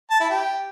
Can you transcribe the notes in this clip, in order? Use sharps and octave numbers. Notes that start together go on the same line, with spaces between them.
A5
E4
G4